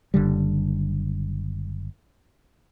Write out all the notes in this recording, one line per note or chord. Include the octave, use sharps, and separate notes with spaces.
F#1 D3 G3